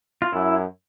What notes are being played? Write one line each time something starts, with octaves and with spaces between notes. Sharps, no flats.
F4
F#2 E4